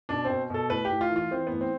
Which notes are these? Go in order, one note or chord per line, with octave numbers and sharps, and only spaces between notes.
B2 D4
B2 C4
B2 A4
A2 B4
G4
A2
F4
E3
F4
E3 C4
A2 B3
C4